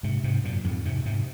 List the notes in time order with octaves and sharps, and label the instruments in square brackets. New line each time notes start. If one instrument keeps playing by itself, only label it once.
[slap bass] G#2 C3
G#2 C3
F#2 A#2
F2 G#2
G#2 C3
G#2 C3